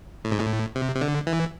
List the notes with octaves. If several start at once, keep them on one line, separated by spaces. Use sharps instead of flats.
A2
G#2
A2
C3
C3
D3
E3